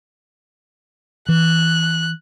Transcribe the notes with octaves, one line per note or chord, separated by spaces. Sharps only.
E3 F#6